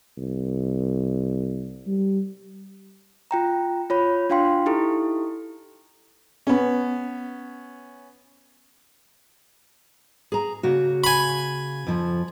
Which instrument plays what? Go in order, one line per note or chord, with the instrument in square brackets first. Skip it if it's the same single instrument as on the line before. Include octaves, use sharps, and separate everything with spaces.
[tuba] C2
G3
[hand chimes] F4 G5 A#5
F4 C#5 B5
D4 F4 F5 G5 C6
D#4 E4 G4 A4
[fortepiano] B3 C#4
[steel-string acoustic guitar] G#4 A#5
C#3 A#3 F#4
[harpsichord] G#5 B5
[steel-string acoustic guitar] F2 F3